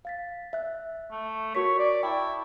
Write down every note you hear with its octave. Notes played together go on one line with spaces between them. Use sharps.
F5 A6 B6
E5 F#6
A3
F#4 A#4 C#5 B6
D5
E4 G5 A5 C#6